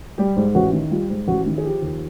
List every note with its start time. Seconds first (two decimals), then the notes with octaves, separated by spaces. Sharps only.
0.18 G3 G4
0.36 G#2
0.55 A1 F#4
0.73 D#3
0.91 G3 F4
1.10 G#2
1.28 A1 F#4
1.46 D#3
1.58 G#4
1.64 F3 G4
1.82 D#2